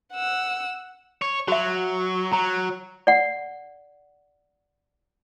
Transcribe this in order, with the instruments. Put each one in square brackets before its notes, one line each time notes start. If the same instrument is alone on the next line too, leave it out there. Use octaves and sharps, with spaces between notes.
[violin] F#5 E6
[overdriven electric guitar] C#5
[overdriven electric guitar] F#3 [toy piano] F#4 E5
[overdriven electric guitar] F#3 [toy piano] A#5
[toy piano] D5 F#5